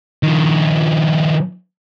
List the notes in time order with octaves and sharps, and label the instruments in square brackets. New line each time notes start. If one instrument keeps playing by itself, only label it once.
[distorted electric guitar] D#3 F3